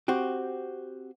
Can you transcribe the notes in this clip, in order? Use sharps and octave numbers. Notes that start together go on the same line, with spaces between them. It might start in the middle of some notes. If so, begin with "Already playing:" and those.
C4 F#4 G4